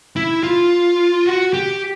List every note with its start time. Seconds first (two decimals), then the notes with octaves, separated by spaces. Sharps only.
0.16 E4
0.43 F4
1.26 F#4
1.53 G4